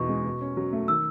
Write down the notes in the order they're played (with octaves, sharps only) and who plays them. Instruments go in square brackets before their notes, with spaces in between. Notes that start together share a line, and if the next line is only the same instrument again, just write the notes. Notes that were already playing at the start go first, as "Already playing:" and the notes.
Already playing: [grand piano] E2 B2 D#4 [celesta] C#6
[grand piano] G#3
B2
C#4
F#3
A3
[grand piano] D#3 [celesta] E6